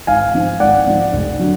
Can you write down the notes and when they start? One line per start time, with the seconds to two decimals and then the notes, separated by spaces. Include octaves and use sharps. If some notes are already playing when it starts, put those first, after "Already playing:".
0.07 G#1 F5 G#5
0.34 G#2 F3
0.60 G#1 D5 F#5
0.87 G#2 F3
1.13 F1
1.39 D3 F#3